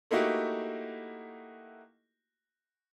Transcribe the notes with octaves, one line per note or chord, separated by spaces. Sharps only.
A3 A#3 D#4 E4 F#4 G4